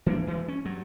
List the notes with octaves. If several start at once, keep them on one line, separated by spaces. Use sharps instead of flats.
E3 A#3 D4
D2 E3 G#3
C#4
G2 F#3